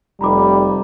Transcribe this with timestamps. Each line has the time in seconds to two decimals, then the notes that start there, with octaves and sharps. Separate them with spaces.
0.21 F1 G3 A#5 B5 D6